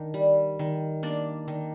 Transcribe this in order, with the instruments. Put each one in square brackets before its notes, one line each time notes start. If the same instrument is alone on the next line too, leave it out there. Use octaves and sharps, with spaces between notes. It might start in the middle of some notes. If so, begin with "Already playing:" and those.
Already playing: [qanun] D#3 D4 D5
G3
D#3
A#3 D4 D5
D#3